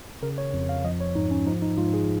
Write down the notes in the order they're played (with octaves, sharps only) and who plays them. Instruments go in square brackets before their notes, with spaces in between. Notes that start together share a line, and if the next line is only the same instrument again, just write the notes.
[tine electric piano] C#3 A#4
C#5
F2
F5
F3 D#5
C#5
G#2 D#4
C#4
F3 D#4
D#4
G#2 F4
G#4